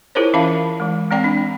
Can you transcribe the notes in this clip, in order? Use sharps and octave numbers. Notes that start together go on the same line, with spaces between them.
E4 F4 G#4 A#4 C5 C#5
E3 C#4 E5 F5 A5 B5
E3 G#3
G#3 C4 D5 G5
D4